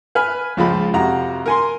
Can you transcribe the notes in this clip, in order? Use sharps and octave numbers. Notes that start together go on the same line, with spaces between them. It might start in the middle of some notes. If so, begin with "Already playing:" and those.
B4 G#5 F6
C#2 F3 G#3 B5
F2 C3 F#4 A#5
A#4 G#5 C6